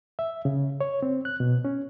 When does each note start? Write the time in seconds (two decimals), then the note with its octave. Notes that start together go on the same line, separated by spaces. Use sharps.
0.19 E5
0.45 C#3
0.81 C#5
1.02 C4
1.25 F#6
1.40 B2
1.65 C#4